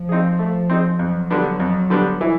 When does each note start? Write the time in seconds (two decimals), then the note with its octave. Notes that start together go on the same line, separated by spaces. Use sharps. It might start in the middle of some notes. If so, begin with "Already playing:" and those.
Already playing: F3
0.09 C4 D#4 G#4
0.39 A3
0.70 C4 D#4 G#4
0.99 F2 F#3
1.30 D3 G3 B3 D4
1.60 F2
1.90 D3 G3 B3 D4
2.21 E3